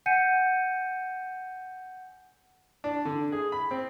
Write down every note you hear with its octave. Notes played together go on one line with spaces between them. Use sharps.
F#5 G#5 G6 C#7 D#7
D4
D3
G#4
B5
C4